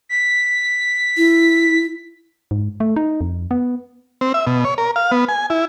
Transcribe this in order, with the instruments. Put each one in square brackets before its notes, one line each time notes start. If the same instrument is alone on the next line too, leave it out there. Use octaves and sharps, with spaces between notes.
[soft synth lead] B6
[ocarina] E4
[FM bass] G#2
A3
D#4
F2
B3
[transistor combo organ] C4
E5
B2
C#5
A#4
F5
B3
G#5
E4